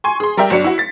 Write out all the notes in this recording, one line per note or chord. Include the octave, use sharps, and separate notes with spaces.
G#5 C6 C#6
G#4 C6
G3 A#4 D5 E5 G5
G1 F#3 D4 C#7
E4 F#4
A6 B6